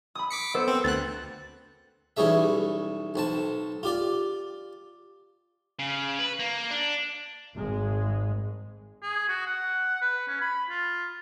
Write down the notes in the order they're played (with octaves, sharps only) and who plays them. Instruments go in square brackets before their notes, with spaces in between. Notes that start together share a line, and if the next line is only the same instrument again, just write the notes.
[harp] B5 D#6
[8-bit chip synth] D6 B6 C#7
[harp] B3 A4 C5
[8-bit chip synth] C4
[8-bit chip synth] D2 F#6 [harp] A6
[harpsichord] B1 E3 G3 C#4 G#4 E5
B1 C4 A5
F4 G4 D5
[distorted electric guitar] C#3
B4
A#3
D4
[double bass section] G#1 G#3
[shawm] G#4
F#4
F#5
B4
C#4
B5
F4